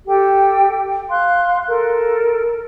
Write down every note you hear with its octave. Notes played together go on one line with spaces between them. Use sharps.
G4 A4 G5
F5 C6 F#6
A4 A#4